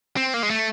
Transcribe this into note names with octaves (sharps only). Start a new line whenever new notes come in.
C4
A#3
G#3
A3